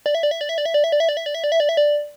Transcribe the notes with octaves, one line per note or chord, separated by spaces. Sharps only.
D5
E5
D5
E5
D5
E5
D5
E5
D5
E5
D5
E5
D5
E5
D5
E5
D5
E5
D5
E5
D5